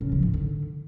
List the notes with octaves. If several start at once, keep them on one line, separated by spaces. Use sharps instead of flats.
C#3
F3
G#2
D3